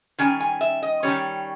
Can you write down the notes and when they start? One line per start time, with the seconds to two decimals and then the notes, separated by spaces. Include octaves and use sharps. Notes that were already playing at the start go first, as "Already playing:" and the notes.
0.18 D#3 G3 C#4 G#5
0.40 G#5
0.61 E5
0.83 D#5
1.03 D#3 G3 C#4 C#5